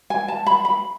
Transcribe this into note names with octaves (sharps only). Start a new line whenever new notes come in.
G#5
A5
B5
B5